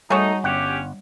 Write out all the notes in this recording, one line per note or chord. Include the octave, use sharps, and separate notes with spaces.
G3 A3 D#4 F#4 G#4 C#5
G1 C#4 G4 F#5